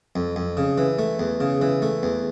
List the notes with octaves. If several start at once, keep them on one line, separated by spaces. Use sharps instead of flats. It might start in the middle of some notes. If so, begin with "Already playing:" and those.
F2
F2
C#3
E3
A3
E2
C#3
E3
A3
E2